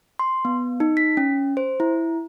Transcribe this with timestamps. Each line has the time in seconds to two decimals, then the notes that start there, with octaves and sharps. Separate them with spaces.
0.19 C6
0.45 B3
0.80 D#4
0.97 B6
1.17 C#4
1.57 C5
1.80 E4